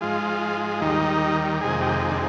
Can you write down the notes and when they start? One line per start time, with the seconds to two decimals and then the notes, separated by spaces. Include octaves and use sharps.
0.01 G#2 F3 G#3 F4
0.80 D#2 D#3 G3 D#4
1.61 F2 C3 D#3 G#3 G#4
1.81 G4
2.11 D4